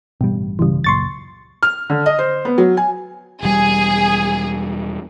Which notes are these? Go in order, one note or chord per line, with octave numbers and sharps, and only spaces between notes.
A1 G2 B2 G3
B1 G2 C#3 E3 G3
C#2 F#2 A#2 C6 C#6 A6
F6
D3
D#5
C5
B3
F#3
G#5
E1 G3 G#4